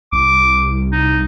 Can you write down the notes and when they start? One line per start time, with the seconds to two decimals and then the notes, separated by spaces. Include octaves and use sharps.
0.13 C2 D6
0.92 D#4